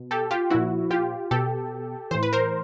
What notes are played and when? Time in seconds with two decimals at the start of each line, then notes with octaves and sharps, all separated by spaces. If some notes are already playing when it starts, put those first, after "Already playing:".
Already playing: B2
0.11 G4 A4
0.31 F4 G4
0.50 A#2 F3 E4 F#4
0.91 F4 G4
1.31 B2 G4 A4
2.11 A2 E3 C5
2.23 B4
2.33 A#4 C5